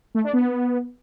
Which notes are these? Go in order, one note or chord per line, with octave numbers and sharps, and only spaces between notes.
A3
D4
B3